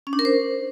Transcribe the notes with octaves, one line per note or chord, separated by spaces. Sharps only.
C#4
D4
A#4
C5